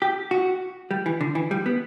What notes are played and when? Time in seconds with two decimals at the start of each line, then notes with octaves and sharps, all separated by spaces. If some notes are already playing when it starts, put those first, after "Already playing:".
0.02 G4
0.31 F#4
0.91 G3
1.06 E3
1.21 D3
1.35 E3
1.51 G3
1.66 B3